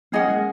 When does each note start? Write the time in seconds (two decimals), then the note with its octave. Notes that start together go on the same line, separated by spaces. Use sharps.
0.12 A#3 C#4 G#4 D#5 F#5
0.28 G#3